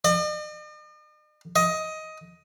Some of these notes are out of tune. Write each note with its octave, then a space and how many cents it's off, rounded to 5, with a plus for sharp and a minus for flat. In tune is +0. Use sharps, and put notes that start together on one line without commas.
D#5 -45
D#5 +15